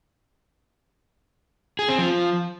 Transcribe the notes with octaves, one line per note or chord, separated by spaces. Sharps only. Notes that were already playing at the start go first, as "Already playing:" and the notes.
G#4
C4
F3